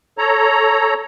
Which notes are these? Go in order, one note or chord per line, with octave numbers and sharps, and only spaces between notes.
A4 C#5 A#5